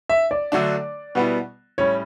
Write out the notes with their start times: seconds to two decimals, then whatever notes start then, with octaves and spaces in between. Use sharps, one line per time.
0.09 E5
0.31 D5
0.52 D3 F#3 A3 D4
1.15 B2 G3 B3 E4
1.78 A2 G3 C#4 C#5